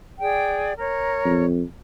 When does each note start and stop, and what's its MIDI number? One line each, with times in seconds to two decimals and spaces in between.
0.20 0.73 68
0.20 0.73 74
0.20 0.73 79
0.77 1.44 70
0.77 1.44 73
1.25 1.61 41